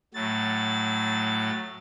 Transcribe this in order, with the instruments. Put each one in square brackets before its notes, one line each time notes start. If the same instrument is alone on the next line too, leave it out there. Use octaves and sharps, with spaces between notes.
[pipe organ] A2 F#3 A6